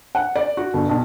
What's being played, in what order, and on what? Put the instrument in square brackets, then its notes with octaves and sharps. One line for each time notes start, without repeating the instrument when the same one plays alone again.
[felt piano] F#5
D5
F#4
G1
B1